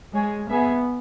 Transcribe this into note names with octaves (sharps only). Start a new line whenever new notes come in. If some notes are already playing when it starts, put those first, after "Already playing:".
G#3 G#4 C#5 G#5
B3 G#4 E5 G#5